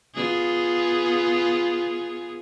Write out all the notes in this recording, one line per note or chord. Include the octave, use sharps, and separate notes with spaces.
B3 F4 G#4